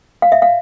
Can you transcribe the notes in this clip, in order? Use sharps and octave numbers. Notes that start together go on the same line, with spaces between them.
F5
E5
F5